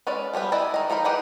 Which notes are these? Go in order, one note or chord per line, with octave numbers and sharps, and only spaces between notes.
G#3 C#4 B4 D5
F3 G3 B3 B4
E4 B4 D5 D#5 G#5
D#3 D#5
F3 D#4 A#4 B5
G4 G#4 B4 D#5 F#5